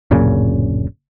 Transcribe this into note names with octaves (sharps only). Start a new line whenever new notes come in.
D1 F#2 A#2 C#3